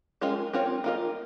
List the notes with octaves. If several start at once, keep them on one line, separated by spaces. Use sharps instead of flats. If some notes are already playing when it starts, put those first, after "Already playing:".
G#3 C#4 F4 A#4 D#5
C4 F4 A#4 C#5
A#3 F4 A#4 D#5